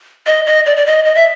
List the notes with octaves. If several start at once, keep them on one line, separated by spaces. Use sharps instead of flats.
D#5
D#5
D5
D5
D#5
D#5
E5